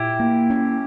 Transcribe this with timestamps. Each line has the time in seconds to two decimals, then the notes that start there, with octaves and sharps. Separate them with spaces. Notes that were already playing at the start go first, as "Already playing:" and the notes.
Already playing: A#2 E4 G4
0.20 A#3
0.50 C#4